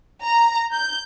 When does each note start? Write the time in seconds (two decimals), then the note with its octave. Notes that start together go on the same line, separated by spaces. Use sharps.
0.23 A#5
0.72 G6